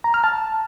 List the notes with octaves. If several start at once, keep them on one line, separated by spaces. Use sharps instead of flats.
A#5
F6
A5